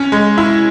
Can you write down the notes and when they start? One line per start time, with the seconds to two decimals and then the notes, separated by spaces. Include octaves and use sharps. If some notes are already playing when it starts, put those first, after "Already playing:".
Already playing: C#4
0.12 G#3
0.38 E4